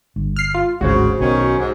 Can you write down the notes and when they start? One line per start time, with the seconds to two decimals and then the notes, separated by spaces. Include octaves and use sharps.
0.16 G1
0.36 F6 C7
0.54 F4
0.81 D1 G#1 C#3 F#4 C5
1.20 B1 D#3 C#4
1.58 G#2